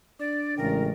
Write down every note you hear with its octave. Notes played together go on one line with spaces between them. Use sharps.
D4 D5
A1 C#3 G#3 A#4 G5